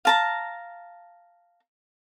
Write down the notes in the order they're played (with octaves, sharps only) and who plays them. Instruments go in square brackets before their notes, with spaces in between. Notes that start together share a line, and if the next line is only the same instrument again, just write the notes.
[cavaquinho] F5 A5 A#5